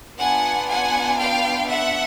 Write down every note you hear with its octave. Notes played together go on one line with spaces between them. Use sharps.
B3 D4 F4 F#5 G#5
F#5 G#5
F5 G5
E5 F#5